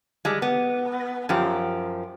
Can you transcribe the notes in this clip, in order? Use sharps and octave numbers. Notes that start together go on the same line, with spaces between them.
G3 G#3
B3
F#2 F3 G4